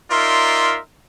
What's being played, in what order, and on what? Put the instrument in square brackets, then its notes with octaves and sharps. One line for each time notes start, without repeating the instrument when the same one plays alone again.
[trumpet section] D#4 F4 A#4 D5 E5 C6